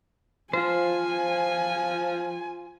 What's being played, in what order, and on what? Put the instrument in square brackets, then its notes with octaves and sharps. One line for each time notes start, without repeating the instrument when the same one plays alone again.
[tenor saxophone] F3 [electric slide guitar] F4 C5 [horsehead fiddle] G#5